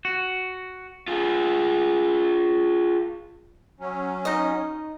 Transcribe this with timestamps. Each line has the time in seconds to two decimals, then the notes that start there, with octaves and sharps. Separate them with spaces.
0.05 F#4
1.08 F4 G#4
3.80 F#3 C#4
4.25 D#4 D#5